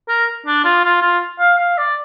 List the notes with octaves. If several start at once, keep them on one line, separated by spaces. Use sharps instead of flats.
A#4
D4
F4
F4
F4
F5
F5
D5